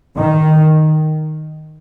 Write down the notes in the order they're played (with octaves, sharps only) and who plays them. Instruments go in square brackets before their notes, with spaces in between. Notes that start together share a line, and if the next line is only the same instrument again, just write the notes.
[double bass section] D#3